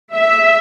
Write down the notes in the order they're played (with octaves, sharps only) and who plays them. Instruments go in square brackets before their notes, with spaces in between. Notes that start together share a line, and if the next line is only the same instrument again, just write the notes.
[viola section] E5